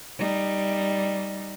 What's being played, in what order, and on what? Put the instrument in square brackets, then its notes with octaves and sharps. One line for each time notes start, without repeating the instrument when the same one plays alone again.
[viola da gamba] G3 D#4